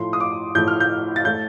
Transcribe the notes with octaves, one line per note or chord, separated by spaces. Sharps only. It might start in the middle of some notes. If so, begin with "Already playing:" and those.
Already playing: A2 F3 A3 C6
D#6
D6
A2 F3 A3 G6
F6
G6
A6
A2 A3 G6